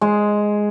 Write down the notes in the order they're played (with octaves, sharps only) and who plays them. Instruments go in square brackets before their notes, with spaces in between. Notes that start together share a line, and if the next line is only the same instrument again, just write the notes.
[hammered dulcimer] G#3